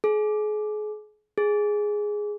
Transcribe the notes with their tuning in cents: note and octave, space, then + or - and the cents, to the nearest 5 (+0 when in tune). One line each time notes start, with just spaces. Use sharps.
G#4 +35
G#4 +0